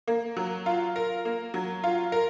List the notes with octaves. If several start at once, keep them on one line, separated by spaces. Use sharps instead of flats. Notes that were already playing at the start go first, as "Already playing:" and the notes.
A#3
F#3
F4
A#4
A#3
F#3
F4
A#4